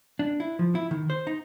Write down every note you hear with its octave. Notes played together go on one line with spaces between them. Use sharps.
D4
E4
F3
E4
D#3
C5
D#4